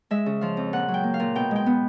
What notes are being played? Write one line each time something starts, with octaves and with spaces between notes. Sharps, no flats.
G#3 E5
C#3
F3 F5
F2
A#2 F#5
F#3
G5
A#3
F5
A#2
B2 G5
G#3 G5
B3